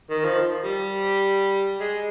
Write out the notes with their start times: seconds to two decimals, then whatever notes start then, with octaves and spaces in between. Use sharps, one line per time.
0.10 D#3
0.25 F3
0.64 G3
1.80 G#3